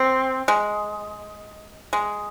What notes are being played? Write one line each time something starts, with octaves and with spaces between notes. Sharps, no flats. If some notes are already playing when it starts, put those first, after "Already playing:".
Already playing: C4
G#3
G#3